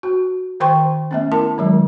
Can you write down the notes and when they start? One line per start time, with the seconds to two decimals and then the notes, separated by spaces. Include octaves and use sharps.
0.03 F#4
0.60 D#3 C5 G5 C6 C#6
1.11 A3 B3 C#4
1.32 E4 A#4 A5
1.58 D#3 F#3 G#3